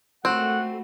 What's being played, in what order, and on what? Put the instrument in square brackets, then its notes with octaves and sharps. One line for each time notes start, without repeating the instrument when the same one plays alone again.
[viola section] A3 [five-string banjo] C4 [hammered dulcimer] F#4 B5 [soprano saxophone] F#5